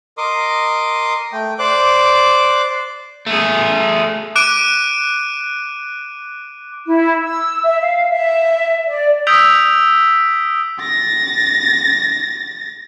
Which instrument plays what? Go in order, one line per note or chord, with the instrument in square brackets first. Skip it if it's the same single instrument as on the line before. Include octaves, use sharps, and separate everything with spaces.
[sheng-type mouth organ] A#4 D#5 C6 D6 D#6
A3 G5
C5 D5 D6 F#6
[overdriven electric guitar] A3 G#4
[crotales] D6 F#6 D7 D#7
[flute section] E4
E6
E5
F5
E5
D5
[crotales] D#6 E6 G6 B6 D7 F7
[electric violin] A6 A#6